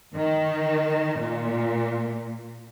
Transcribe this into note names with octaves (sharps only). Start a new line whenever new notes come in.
D#3
A#2